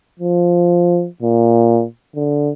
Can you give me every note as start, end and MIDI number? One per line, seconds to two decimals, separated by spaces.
0.19 1.07 53
1.22 1.84 46
2.16 2.52 50